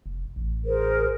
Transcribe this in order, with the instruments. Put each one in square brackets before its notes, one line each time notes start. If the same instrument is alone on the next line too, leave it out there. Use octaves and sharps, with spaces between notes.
[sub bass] F1
A1
[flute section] G#4 A#4 C5